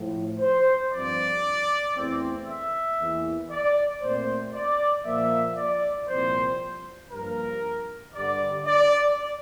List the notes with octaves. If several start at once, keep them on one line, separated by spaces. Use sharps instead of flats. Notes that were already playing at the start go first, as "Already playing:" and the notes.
Already playing: A2 F3
C5
G2 F3 C4 D5
E2 E3 A3 C4
E5
E2 E3 A#3
D5
A#2 A3 C4 C5
D5
A#2 F3 A#3 E5
D5
C2 A#2 F3 C4 C5
G2 F3 A#3 A#4
G2 D3 G3 D5
D5